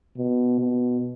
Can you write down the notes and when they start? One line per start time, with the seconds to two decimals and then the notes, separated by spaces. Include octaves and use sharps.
0.18 B2
0.60 B2